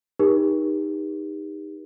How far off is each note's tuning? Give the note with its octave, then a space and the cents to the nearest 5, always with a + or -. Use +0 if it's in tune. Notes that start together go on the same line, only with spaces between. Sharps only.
D#4 +0 G4 +35 A#4 +40